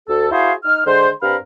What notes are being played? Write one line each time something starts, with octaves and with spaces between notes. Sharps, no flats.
D2 A4
E4 F#4 G#4 C5 F5
D#4 D#5 F6
D3 G#3 C5
G2 C4 A#4 F5 B5